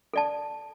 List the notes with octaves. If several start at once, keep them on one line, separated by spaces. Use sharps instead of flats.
A4 D5 A5